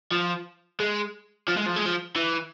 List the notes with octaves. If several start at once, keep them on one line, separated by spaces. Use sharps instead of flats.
F3
G#3
F3
G#3
F3
G#3
F3
E3